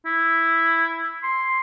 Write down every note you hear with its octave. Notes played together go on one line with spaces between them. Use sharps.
E4
C6